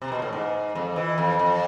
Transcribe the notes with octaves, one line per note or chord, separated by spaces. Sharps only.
C3
B2
A2
G#2
F2
E3
F2
F2